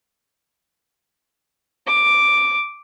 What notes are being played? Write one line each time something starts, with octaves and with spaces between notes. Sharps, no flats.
D6